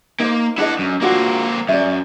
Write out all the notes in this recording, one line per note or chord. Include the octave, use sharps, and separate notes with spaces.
A#3 D#4 C5
D4 E4 A4 D#5 F#5
F#2
A#3 C4 D4 F4 F#4
F#2 D5 E5